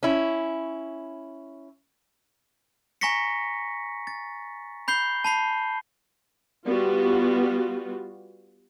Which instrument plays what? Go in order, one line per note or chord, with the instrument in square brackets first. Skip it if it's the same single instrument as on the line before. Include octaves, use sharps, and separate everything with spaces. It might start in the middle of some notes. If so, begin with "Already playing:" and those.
[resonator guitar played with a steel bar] C#4 E4
[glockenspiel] G#5 A#5 C#6 A#6 B6 C#7
A6
B5 G6 C7 G7
A5 B5 C7
[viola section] G3 B3 F4 F#4